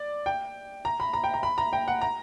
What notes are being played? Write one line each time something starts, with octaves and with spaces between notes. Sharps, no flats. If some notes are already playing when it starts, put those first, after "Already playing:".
Already playing: D5
G5
A#5
B5
A#5
G5
A#5
B5
A#5
G5
F#5
A#5